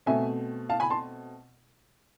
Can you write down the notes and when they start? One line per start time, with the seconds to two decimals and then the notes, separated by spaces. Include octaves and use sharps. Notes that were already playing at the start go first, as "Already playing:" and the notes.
0.06 B2 A3 C4 E5 G#5
0.69 F5 A5
0.80 G#5 B5
0.90 A5 C6